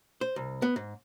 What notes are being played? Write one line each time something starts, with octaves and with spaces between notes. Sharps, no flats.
C5
C2
B3
G#2